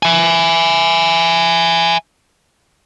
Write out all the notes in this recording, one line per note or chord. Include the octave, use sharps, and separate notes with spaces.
E5 G#5